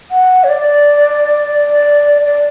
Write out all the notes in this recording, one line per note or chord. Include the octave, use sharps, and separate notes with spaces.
F#5
C#5
D5
D5